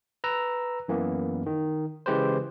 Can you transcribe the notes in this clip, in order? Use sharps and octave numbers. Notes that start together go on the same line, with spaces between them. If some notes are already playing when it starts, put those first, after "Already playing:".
B4 A#5 E6
F#2 E3 A#3 B3
D#3
C#3 E3 G#3 G4 B4 C5